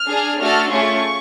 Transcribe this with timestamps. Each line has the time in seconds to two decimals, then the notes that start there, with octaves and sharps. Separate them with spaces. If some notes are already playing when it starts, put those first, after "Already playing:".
Already playing: F6
0.10 D4 G#4
0.40 A3 D4 F#4 A4 F6
0.71 A3 C#4 F4 G#4 C#6